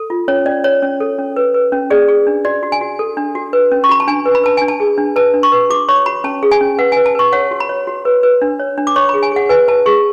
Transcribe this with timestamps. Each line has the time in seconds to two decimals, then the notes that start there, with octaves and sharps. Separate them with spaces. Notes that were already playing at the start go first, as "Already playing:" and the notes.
Already playing: A4
0.10 F4
0.28 C#4 C#5
0.46 C#4 D5
0.64 C#5
0.82 C#4
1.00 A4
1.18 C#4
1.36 B4
1.54 B4
1.72 C#4
1.90 G#4 D5
2.08 G#4
2.27 D4
2.45 F#4 D5
2.63 F#4
2.72 G#5
2.81 F#4
2.99 A4
3.17 D4
3.35 F#4
3.53 B4
3.72 C#4
3.84 C#6
3.89 F#4 B5
4.00 A5
4.07 D4 G#5
4.25 B4
4.35 B5
4.44 B4 A5
4.57 D4 G#5
4.68 A5
4.80 G#4
4.98 D4
5.16 B4 A5
5.34 D4
5.43 C#6
5.52 B4
5.70 F#4 D6
5.88 C#5 C#6
6.06 F#4 B5
6.24 C#4 A5
6.43 G#4
6.51 G#5
6.61 C#4
6.78 B4 F#5
6.92 G#5
6.97 B4
7.06 A5
7.15 B4 C#6
7.33 C#5 F#5
7.51 F#4
7.60 B5
7.69 C#5
7.87 F#4
8.05 B4
8.23 B4
8.42 D4
8.60 C#5
8.78 D4
8.87 D6
8.96 C#5 C#6
9.09 B5
9.14 G#4
9.23 G#5
9.32 G#4 F#5
9.49 B4 G#5
9.68 B4 A5
9.86 G#4 C#6